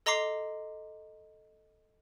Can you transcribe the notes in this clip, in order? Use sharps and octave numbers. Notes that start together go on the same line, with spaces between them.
A4 D#5 A#5 C6 D6 C7